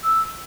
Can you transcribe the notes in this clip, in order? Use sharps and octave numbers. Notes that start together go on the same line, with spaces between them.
E6